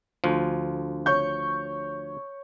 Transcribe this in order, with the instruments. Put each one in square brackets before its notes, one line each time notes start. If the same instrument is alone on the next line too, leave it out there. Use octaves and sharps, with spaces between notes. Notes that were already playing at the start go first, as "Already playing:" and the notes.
[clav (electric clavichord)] D2 F3
[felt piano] C#5 C#6 G6